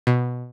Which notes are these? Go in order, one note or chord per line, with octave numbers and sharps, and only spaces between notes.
B2